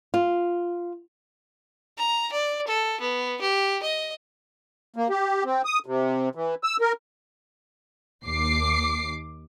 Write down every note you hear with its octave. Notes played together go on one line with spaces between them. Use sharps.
F4
A#5
D5
A4
B3
G4
D#5
A#3
G4
C4
D#6
C3
E3
E6
A#4
D#2 D6 C7